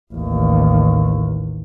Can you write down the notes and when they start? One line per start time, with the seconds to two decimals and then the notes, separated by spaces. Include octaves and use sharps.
0.14 A1 D#2